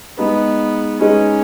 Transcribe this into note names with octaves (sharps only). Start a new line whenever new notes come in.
G#3 B3 D#4 G#4 B4
G#3 C#4 D#4 G#4 B4